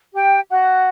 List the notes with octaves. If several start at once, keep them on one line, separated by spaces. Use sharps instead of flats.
G4 G5
F#4 F#5